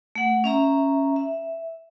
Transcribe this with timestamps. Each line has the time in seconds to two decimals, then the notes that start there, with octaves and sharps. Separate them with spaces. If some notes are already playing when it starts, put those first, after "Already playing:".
0.15 A3 F#5
0.44 C#4 E5 A#5
1.16 E5